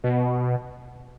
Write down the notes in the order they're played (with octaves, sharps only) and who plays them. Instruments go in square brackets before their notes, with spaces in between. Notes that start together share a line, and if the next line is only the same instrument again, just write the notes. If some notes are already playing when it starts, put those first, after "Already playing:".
[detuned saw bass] B2